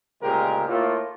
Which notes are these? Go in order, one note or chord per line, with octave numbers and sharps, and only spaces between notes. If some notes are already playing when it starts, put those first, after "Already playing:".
D2 A#2 C#3 G#3 G4 A#4
A2 A3 A#3 F4